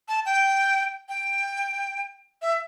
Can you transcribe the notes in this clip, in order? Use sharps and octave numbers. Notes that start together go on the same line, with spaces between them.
A5
G5
G5
E5